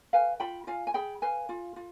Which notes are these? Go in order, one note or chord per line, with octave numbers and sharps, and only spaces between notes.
B4 F5 G#5
F4 G5 B5
F4 F5 G#5
G#5
G#4 G5 B5
B4 F5 G#5
F4
F4